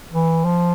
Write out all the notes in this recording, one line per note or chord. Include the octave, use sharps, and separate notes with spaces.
E3
F3